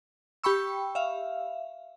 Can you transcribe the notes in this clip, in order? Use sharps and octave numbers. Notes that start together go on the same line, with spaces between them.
G4 G5 B5 C#6 E6
E5 F5